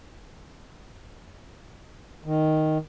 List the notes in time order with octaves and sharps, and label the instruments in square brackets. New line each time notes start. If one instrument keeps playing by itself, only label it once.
[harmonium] D#3